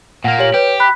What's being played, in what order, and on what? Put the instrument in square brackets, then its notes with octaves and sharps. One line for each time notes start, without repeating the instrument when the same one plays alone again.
[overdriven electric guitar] A#2 A#3 [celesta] F#5
[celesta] G4 C#5 F#7
[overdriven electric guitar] G4 [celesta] B4 C#5
[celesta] B5 F#6 B6